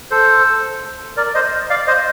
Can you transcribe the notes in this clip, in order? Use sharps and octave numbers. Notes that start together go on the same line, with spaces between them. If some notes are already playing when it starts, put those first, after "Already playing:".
A4 C5
A#4 D5
C5 D#5
D5 F5
C5 D#5